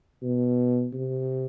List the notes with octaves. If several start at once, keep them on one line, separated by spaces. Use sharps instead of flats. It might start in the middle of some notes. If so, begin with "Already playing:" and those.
B2
C3